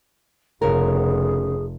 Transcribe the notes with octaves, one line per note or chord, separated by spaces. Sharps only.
F1 C#3 F#4 G#4 A#4